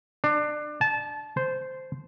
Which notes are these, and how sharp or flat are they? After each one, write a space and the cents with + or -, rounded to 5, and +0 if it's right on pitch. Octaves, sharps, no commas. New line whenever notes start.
D4 +25
A5 -25
C5 -10